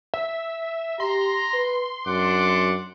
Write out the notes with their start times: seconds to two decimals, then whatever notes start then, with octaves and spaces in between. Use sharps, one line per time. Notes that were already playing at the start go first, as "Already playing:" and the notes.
0.14 E5
1.00 G4 A#5 C6
1.54 B4
2.07 F#2 D4 F#5 D6